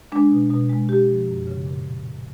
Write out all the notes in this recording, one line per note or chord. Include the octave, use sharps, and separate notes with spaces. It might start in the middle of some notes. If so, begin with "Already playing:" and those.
G#3 D4
B2
B2
G#3
G#3 G4
F3
F#2
C#3
A#2